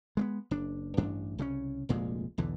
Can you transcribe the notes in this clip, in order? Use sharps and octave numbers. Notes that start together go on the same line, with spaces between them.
G#3 A3 B3
F#1 D4
A1 G2 D4
C2 C#3 C4 C#4
F1 D2 A#2 G#3
B1 E2 D3 E3